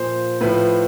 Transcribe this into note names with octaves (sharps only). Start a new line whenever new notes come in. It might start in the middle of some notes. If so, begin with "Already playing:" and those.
Already playing: A#2 F3 C5
A2 F3 B4